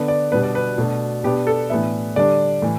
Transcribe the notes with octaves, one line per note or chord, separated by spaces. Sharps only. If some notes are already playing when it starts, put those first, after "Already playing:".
Already playing: D3 B3 D4
D5
B2 G3 B3 D4 B4
D5
B4
B2 A3 D4
B2 B3 D4 G4
A4
A2 E3 B3 D4 E5
D3 G3 D4 D5
A2 E3